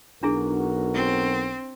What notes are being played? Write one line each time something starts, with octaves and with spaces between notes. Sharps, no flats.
B1 D4 E4 F#4 G#4 A#4
C4